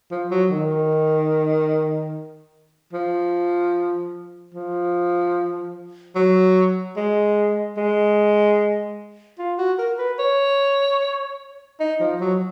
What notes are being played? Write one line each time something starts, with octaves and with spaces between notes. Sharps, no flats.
F3
F#3
D#3
F3
F3
F#3
G#3
G#3
F4
F#4
A#4
B4
C#5
D#4
F3
F#3